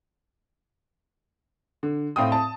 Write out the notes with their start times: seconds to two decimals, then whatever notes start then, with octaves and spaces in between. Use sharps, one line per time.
1.83 D3
2.16 A2 C4 F5 G5 D#6
2.32 A5